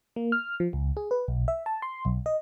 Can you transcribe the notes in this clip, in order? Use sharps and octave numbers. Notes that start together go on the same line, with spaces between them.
A#3
F6
F3
C#2
G#4
B4
B1
E5
A5
C6
B1
D#5